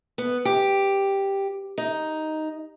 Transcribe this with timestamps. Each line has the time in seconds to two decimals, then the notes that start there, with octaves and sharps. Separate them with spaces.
0.18 B3
0.45 G4
1.78 D#4